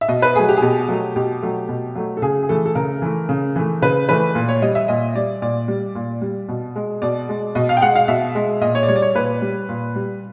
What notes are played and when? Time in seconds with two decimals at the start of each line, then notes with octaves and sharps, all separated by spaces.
0.01 E5
0.08 B2 D#5
0.22 B4
0.36 F#3 A3 G#4
0.49 G4
0.57 G#4
0.62 B2 G4
0.88 F#3 A3
1.16 B2 G4
1.43 F#3 A3
1.69 B2
1.95 F#3 A3
2.17 A4
2.22 C#3 G#4
2.43 G#4
2.49 E3 A3 A4
2.66 A4
2.75 C#3 A#4
3.02 E3 A3
3.29 C#3
3.56 E3 A3
3.82 C#3 B4
4.09 E3 A3 B4
4.35 A#2
4.49 C#5
4.62 G3 D#5
4.75 E5
4.88 A#2 D#5
5.15 G3 D5
5.42 A#2 D5
5.68 G3
5.95 A#2
6.22 G3
6.49 B2
6.76 G#3
7.02 B2 D5
7.29 G#3
7.55 B2 D#5
7.69 F5
7.77 G5
7.82 G#3 F#5
7.96 F5
8.08 B2 E5
8.35 G#3
8.61 A#2 D#5
8.75 C#5
8.83 D5
8.88 G3 C#5
8.96 D5
9.02 C#5
9.15 A#2 B4
9.42 G3
9.69 A#2
9.96 G3